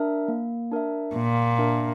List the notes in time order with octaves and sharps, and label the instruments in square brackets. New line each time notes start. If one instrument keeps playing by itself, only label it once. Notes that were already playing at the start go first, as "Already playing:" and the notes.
Already playing: [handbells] D4 A#4 E5
A#3
D4 A#4 E5
[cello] A#2 [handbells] A#3
[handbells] D4 A#4 E5